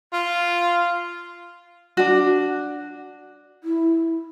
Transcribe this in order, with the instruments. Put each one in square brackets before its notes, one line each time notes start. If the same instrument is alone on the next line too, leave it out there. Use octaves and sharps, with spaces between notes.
[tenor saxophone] F4
[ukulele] D4 F#4
[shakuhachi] E4